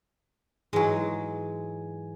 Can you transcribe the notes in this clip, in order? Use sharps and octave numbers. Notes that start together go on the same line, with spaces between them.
G#2 E3 F#3 G#3 G#5